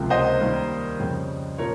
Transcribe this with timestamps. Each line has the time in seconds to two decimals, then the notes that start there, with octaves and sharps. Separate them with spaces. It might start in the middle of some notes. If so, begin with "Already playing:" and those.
Already playing: C#2 C3 F3 A#3
0.10 C5 D#5
0.40 D#2 D#3 G3 A#3
0.99 F2 C#3 G3
1.58 A#2 F3 A#3 A#4 C#5